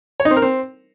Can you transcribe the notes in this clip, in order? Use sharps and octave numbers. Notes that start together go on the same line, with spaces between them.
C#5
D#4
C4
A#4
C4